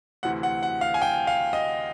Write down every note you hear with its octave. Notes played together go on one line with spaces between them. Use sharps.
D2 C3 E3 F#5
F#5
F#5
F5
G#5
G5
F5
D#5